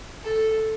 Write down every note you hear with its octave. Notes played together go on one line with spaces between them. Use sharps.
A4